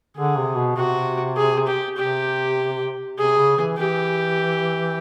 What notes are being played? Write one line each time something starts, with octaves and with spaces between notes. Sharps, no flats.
D3 G#4
C3
B2
C3 F#4
G#4
G4
C3 G4
C3 G#4
C#3
E3
E3 G4